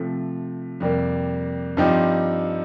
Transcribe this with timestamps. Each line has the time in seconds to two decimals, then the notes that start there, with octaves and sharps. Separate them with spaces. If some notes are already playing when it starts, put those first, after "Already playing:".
Already playing: C3 F3 A3
0.80 F2 C3 G3 A#3
1.77 G2 F3 C4 D#4 G4